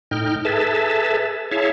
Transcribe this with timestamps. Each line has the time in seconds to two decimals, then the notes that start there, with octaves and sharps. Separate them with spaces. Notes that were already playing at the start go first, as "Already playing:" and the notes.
0.11 A2 D#4 G5 F6
0.45 G#4 A4 B4 E5 A5
1.51 E4 G#4 C#5 E5 F5 A5